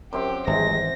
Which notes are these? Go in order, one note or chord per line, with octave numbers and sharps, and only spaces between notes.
F#2 C4 G4 C6
G#1 C3 E3 F3 G3 G#3 A#6